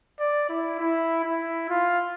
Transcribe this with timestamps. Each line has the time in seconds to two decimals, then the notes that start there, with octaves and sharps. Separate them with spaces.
0.20 D5
0.49 E4
0.79 E4
1.24 E4
1.69 F4